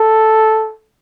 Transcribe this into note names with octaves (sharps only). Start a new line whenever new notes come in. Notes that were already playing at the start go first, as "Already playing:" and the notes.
Already playing: A4